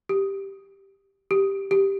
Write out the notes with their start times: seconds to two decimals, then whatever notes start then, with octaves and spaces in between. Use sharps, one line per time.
0.09 G4
1.31 G4
1.71 G4